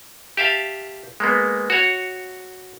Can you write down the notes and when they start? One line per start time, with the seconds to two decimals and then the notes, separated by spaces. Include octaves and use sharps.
0.37 G4 E5 F5 A5
1.20 G#3 A#3 B3
1.70 F#4 C#5